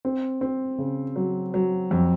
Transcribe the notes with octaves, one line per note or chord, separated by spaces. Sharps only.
C4
C4
C#3
F#3
F#3
F2